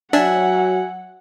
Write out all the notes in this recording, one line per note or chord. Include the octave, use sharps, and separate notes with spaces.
F#3 D4 E5 F#5 G#5